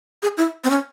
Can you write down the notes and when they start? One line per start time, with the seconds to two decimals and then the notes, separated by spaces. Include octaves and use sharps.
0.23 G#4
0.37 E4
0.64 C4
0.70 C#4